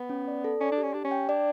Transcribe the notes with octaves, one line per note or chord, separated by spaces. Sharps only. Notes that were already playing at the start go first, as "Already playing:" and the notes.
Already playing: B3
C#4
D5
A4
C#4 D5
D4
G4
C#4
D4 G4
C#4
G5
D4 D5